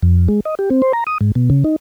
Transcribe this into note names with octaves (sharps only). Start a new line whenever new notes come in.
F2
G#3
D#5
G4
C4
C5
A#5
D#6
G#2
B2
C#3
D#4